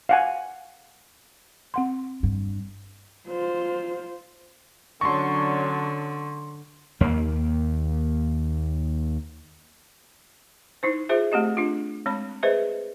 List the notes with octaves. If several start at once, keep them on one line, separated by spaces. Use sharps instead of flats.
F5 F#5 G#5
C4 F#5 C6
G2
F4 C5
D3 F#3 C#4 D4 C6 C#6
D#2 A#3
D#4 E4 C5
F4 G#4 C5 E5
A3 C4 G4 D#5
D4 F4
G#3 C4 C#5 B5
G#4 B4 C5 D#5 E5